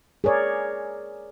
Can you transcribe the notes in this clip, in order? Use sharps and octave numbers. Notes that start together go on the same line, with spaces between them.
G#4 A#4 C#5 D5